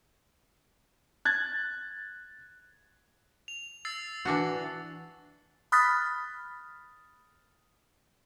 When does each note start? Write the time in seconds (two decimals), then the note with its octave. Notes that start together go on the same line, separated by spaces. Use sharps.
1.25 F#6 G#6 A6
3.48 F7
3.85 E6 A6 C7
4.25 E3 D4 F#4
5.72 B5 D#6 F6 F#6 A6 B6